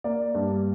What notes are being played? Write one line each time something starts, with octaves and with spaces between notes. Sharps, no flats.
A#3 D5
G2